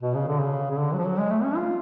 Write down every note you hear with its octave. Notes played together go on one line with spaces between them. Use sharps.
B2
C#3
D3
C#3
C#3
D3
F#3
F3
F#3
G#3
A3
C#4
F4